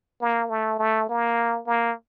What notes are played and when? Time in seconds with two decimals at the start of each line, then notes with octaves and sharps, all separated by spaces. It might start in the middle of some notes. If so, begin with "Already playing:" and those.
0.21 A#3
0.50 A3
0.79 A3
1.09 A#3
1.67 A#3